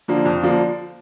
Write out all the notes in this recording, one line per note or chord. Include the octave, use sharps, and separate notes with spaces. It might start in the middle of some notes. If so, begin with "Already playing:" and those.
D3 F3 A#3 D4
F2
D3 F3 A#3 D4